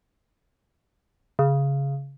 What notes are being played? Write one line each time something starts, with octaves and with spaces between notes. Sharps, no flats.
C#3